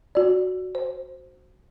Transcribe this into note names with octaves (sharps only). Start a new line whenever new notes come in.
F#4 D5
C5